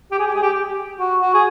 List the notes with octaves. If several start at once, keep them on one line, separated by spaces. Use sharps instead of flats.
G4
G#4
G4
G#4
G4
F#4
F#4
G#4